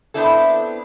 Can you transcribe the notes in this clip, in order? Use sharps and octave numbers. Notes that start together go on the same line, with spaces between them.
B3 C4 D4 E4 A4